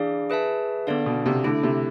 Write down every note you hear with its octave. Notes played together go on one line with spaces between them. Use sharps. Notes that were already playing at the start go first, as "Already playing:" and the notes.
Already playing: E3 D4 G#4 D5 F5
G#4 B4 E5 A5
D3 B3 D4 A4 D5 F5
B2
C3
D3 A3 E4 A4
C3